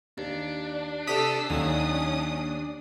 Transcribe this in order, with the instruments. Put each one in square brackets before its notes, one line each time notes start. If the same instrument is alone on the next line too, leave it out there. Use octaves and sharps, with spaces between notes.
[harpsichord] D#2 [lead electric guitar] D4
[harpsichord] C3 G4 [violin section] A4 E6 [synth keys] D#6 B6
[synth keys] D#2 [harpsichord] F#3 [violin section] C#4 D#6